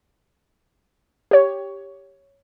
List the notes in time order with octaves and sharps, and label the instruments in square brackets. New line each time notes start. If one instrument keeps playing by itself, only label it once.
[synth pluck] G4 C#5